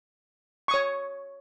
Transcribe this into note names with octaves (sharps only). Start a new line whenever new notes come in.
C#5 C#6 D#6